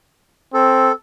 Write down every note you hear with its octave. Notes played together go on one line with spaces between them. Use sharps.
C4 A4